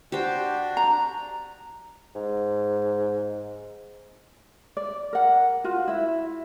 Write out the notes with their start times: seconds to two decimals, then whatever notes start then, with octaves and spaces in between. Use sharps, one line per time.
0.12 D4 F#4 G4 C5
0.77 A#5
2.15 G#2
4.77 D5
5.13 A#4 F#5
5.64 F4 F#4
5.88 E4 E5